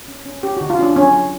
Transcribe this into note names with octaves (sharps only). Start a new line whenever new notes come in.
C#4
C#4
C#4 G4
D3 F#4
F4
C#4 D4
F#3 C#4
F#3